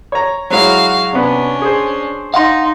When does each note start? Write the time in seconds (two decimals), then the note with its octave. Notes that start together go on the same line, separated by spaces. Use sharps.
0.12 C#5 A#5
0.50 F#3 G#3 E4 F#4 F5
1.13 C3 B3 C#4 D4
1.62 G#4 C5
2.34 D#4 F5 F#5 C6